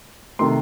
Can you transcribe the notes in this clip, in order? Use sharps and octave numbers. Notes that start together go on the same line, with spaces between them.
C3 D#3 A3 C6